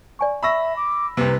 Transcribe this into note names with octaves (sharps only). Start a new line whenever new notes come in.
D5 G#5 C#6
E5 A#5 B5 C#6 E6 A#6
D6
C2 C3 B4